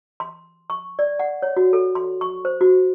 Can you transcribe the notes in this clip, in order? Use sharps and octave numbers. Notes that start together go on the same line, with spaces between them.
C6
C#6
D5
F#5
C#5
F#4
A4
C6
C#6
C5
F#4